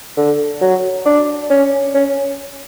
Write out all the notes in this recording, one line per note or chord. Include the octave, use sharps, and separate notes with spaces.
D3
F#3
D4
C#4
C#4